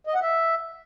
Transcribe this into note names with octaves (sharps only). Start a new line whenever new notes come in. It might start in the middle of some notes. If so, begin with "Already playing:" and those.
D#5
F#5
E5